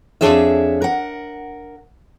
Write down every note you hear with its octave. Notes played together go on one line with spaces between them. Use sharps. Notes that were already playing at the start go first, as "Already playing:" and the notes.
F2 G#2 D4 G#4 C#5 E5
A#4 F#5